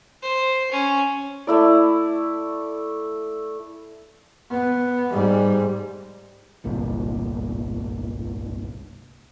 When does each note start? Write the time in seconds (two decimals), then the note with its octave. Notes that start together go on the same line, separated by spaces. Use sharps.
0.22 C5
0.71 C#4
1.47 A3 E4 D5
4.51 B3
5.11 G#2 G3
6.64 D1 G1 C2 A#2